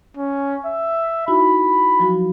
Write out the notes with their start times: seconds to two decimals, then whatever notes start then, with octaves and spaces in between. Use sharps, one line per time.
0.17 C#4
0.66 E5
1.28 D#4 E4 F#4 B5
1.99 F3 F#3 F#4